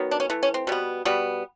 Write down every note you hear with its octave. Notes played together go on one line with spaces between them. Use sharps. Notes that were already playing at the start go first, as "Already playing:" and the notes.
Already playing: D#3 F#3 B3
D4
C#4
E3 A3
C#4
C4
B2 G3 B3
B2 G3 B3